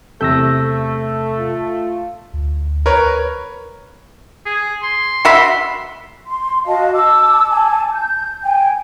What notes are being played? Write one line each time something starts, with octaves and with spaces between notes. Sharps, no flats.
E2 C3 A3 A4 E6 G6 A#6
F4
D2
A#4 B4 C#5
G#4
C6
F#4 E5 B5
C6
F#4 D#5 F5 A5
A5 D6 E6
G#5 A5
G6
G5 G#5